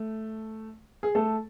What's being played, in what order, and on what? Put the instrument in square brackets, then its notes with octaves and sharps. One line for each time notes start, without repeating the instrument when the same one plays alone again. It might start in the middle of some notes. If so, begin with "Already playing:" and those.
Already playing: [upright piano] A3
G#4
A3 A4